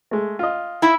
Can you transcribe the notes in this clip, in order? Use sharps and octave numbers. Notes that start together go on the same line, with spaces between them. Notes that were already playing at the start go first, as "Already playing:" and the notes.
G#3 A3
F4 D#5
E4 E5